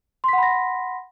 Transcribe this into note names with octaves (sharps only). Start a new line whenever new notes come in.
F#5 B5 C6 A#6 B6